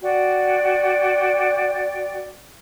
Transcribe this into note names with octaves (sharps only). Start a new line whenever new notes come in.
F#4 D5 G5